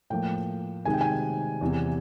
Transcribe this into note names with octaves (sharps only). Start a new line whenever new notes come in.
A2 F3 A#3 G5
C3 D#3 G#3 G#5
G5
G#5
E2 C3 E3